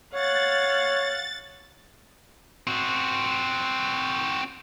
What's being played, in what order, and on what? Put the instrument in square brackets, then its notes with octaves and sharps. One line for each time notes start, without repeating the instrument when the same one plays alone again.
[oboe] C#5 [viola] F5 F#5 [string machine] A6
[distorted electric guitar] C4 F#4